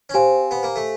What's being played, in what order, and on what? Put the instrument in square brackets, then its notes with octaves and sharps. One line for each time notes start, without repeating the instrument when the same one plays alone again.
[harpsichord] C#4
[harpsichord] C4 [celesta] G4 C5 F5 G#5
[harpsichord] B3
A#3
A3